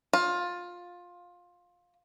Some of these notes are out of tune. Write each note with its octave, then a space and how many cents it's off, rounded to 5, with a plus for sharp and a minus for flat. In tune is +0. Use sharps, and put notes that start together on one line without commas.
F4 +15